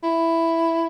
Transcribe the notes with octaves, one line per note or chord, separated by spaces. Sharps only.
E4